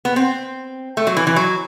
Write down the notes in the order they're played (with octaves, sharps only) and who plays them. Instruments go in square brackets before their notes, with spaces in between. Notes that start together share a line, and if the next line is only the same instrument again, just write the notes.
[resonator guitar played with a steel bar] B3
C4
A3
F#3
E3
E3
F#3